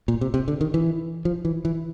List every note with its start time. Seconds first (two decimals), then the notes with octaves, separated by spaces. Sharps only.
0.08 A#2
0.21 C3
0.34 C3
0.48 D3
0.61 D#3
0.74 E3
1.25 F3
1.45 E3
1.65 E3